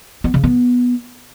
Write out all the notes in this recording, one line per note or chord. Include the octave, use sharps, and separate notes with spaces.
B3
C#3
B3